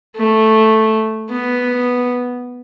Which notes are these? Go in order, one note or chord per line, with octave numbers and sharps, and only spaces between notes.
A3
B3